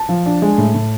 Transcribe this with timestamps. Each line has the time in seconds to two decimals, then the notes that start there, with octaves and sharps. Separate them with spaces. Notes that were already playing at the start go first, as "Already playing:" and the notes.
Already playing: A5
0.09 F3
0.26 D4
0.42 G#3
0.58 A2
0.75 A2